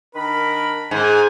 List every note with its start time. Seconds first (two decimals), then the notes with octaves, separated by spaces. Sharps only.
0.15 D#3 D4 A#4 B5
0.91 G#2 G#5